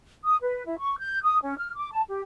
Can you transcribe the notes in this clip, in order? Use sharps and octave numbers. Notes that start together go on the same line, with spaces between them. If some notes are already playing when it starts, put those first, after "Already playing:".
D#6
B4
E4
C#6
G6
D#6
C#4
F6
D6
A5
G4